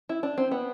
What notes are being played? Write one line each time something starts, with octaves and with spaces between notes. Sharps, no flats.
E4
D4
C4
B3